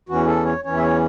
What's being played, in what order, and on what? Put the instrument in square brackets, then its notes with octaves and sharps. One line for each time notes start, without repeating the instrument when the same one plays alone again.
[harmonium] E2 E3 C#4 F#4
A4
C#5
E2 E3 C#4 C#5
E5
C#5